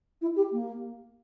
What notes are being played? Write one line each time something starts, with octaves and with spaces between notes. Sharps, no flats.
E4
G4
A#3